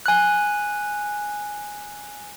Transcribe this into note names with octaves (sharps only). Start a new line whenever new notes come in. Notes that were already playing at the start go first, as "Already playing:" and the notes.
G#5 F#6